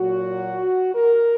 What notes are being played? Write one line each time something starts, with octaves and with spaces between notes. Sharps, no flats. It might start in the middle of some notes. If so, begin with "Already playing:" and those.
Already playing: A#2 F#3 F#4
A#4